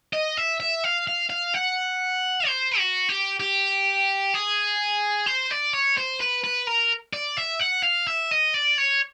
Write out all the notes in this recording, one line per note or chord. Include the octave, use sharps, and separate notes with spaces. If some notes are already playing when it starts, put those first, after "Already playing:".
D#5
E5
E5
F5
F5
F5
F#5
C5
F#4
G4
G4
G#4
C5
D5
C#5
C5
B4
B4
A#4
D5
E5
F#5
F5
E5
D#5
D5
C#5